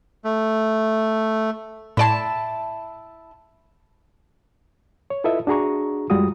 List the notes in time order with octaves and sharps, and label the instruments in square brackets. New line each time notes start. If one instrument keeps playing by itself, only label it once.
[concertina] A3
[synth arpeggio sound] A2 D5 C6 [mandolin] E4 A5
[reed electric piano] C#5
E4 F4 A4 B4 D#5 E5
D4 F#4 G#4 A#5 C#6
F#2 G3 G#3 F4 F#4 D#6